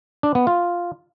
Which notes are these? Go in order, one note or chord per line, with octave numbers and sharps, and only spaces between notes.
D4
B3
F4